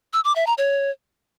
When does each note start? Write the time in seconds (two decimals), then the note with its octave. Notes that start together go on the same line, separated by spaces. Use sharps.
0.13 E6
0.25 D6
0.36 E5
0.47 A#5
0.58 C#5